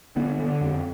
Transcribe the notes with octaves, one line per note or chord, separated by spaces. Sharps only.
D3 B3
D3
F2